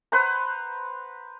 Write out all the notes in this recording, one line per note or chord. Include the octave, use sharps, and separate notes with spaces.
B4 C5 F#5 A#5